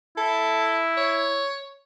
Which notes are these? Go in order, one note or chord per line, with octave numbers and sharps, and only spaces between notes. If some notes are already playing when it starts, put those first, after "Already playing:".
E4 A4
C#5